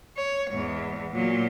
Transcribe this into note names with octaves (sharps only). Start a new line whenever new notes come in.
C#5
E2 G#2
A#2 F#3